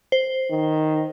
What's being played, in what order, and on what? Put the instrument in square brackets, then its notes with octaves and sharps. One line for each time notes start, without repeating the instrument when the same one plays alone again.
[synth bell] C5
[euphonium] D#3